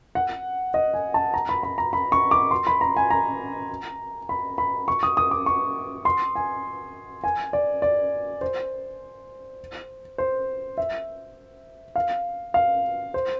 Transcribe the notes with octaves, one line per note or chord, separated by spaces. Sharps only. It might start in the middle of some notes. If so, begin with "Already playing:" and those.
F#5
D#5
G#5
A5
A#5
B5
B5
A#5
B5
C#6
D6
C6
B5
A#5
G#5
A#5
B5
B5
C#6
D#6
D#6
D6
C#6
C6
G#5
G#5
D5
D5
C5
C5
E5
F5
F5
C5